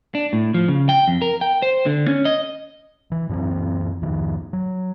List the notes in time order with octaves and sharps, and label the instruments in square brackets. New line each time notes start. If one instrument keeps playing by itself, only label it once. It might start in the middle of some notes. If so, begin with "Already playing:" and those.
[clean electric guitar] D4
A2
F3
C#3
G5
F2
A#4
G5
C5
D3
C#4
D#5
[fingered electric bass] E3
F#2 E3 C4
F2 D#3 F3
F#3